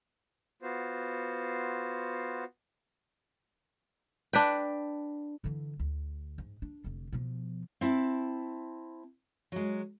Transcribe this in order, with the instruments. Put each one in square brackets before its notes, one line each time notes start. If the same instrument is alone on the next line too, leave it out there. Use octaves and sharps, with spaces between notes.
[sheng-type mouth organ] B3 F4 F#4 C5
[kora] D4 B4 G5
[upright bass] D3 E3
D2
G#2
D4
F1 D3
B2 F3
[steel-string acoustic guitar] C4 E4 A5
F#3 G#3